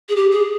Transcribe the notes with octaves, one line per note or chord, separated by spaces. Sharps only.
G#4
G4
G#4